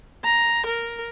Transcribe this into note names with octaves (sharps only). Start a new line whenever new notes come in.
A#5
A#4